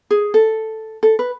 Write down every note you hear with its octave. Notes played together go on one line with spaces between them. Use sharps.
G#4
A4
A4
B4